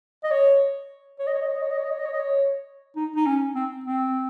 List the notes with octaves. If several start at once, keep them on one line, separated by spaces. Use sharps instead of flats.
D#5
C#5
C#5
D#5
C#5
D#5
C#5
D#5
C#5
D#5
C#5
D#5
C#5
D#5
C#5
D#5
C#5
D#4
D#4
C#4
C4
C4